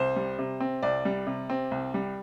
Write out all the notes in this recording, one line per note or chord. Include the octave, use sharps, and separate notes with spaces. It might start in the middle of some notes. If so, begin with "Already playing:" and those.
Already playing: C2 C5
G3
C3
C4
C2 D5
G3
C3
C4
C2
G3